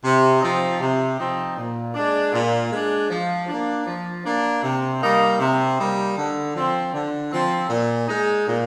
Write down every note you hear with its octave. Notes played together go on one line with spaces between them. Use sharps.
C3
F3 C4 D#4
C3
F3 C4 D#4
A#2
G#3 D4
A#2
G#3 D4
F3
A#3 D4
F3
A#3 D4
C3
G3 A#3 D#4
C3
G3 A#3 D#4
D3
F3 C4
D3
F3 C4
A#2
G#3 D#4
A#2